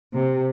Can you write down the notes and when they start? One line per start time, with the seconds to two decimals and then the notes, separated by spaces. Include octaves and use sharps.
0.14 C3